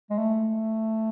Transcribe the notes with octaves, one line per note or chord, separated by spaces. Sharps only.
G#3
A3